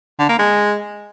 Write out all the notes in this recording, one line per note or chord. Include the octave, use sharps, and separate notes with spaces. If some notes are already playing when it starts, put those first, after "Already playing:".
D3
A#3
G#3